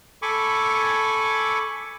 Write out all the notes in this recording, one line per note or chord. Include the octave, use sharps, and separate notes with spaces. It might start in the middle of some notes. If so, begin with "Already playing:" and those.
A4 G#5 B5 C#6 D6